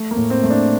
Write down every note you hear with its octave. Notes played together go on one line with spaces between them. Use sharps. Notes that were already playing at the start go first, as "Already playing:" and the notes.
Already playing: A3
A#3
A2
C4
A3
D4